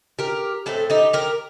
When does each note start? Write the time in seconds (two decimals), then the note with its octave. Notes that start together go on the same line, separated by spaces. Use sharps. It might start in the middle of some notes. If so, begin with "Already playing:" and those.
0.19 G4 A#4
0.66 A2 A3 C4 A4
0.90 D#4 G4
1.13 G4 A#4